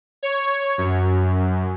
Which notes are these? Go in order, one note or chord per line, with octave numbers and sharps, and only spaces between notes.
C#5
F#2